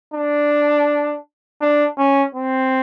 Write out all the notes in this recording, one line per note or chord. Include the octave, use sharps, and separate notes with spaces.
D4
D4
C#4
C4